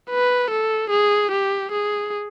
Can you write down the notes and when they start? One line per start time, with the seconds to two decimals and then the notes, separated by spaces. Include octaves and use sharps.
0.11 B4
0.50 A4
0.90 G#4
1.32 G4
1.72 G#4